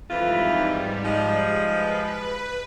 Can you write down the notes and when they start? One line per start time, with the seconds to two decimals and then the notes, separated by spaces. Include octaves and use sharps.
0.11 F2 G#2 E3 G3 F4
1.04 F3 G#3
1.65 B4